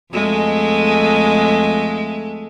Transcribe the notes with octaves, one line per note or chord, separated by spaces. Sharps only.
F2 G#3 A3